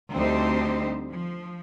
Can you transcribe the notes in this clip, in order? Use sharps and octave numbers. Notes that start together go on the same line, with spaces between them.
D2 G3 C4 D#4 G4 C5
F3